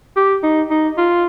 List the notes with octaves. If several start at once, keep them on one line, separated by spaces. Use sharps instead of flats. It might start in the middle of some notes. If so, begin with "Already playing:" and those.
G4
D#4
D#4
F4